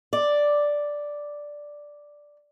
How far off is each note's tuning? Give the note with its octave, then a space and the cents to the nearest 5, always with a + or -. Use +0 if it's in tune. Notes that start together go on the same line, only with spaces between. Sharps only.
D5 +0